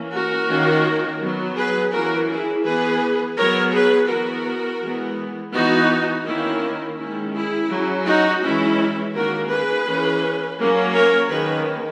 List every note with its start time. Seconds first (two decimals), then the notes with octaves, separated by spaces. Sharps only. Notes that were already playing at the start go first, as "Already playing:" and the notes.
Already playing: E3 A#3 C#4
0.12 F#4 A#4
0.48 D#3 A#3 C#4
1.21 F#3 B3
1.57 G#4 B4
1.93 E3 A#3 C#4 F#4 A#4
2.29 E4 G#4
2.65 E3 B3 G#4 B4
3.37 F#3 B3 A#4 C#5
3.73 G#4 B4
4.09 E3 B3 F#4 A#4
4.81 E3 G#3 B3
5.54 E3 B3 D#4 F#4
6.25 D#3 A#3 C#4 E4
6.98 D#3 G#3 C#4 E4
7.34 E4 G#4
7.70 F#3 C#4
8.05 D#4 F#4
8.42 E3 G#3 C#4 E4
9.14 D#3 A#3 C#4 F#4 A#4
9.51 G#4 B4
9.86 E3 A#3 C#4
10.58 F#3 A#3 C#4
10.94 A#4 C#5
11.30 D#3 A#3 C#4 G#4 B4